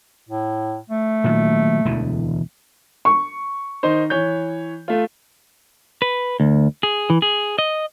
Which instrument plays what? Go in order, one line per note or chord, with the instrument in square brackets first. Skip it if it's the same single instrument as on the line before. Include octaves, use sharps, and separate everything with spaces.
[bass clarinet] A2
A3
[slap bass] A#2 D#3 F#3
E1 D2 E3
[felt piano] C#6
[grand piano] D#3 D#4 C5
E3 C#5 G6
A3 F4
[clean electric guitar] B4
D2
G#4
E3
G#4
D#5